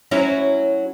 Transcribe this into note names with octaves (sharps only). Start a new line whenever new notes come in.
F#3 C#4 E4